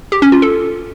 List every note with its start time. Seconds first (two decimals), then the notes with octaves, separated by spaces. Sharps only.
0.12 G4
0.22 C#4
0.32 F4
0.42 A4